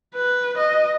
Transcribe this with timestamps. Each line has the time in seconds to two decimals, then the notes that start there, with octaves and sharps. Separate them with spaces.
0.15 B4
0.58 D#5